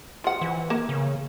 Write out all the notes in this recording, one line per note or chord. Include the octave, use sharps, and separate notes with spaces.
F3 F#5
E3
A#3
C#3